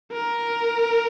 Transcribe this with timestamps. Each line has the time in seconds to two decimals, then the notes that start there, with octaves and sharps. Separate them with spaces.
0.13 A#4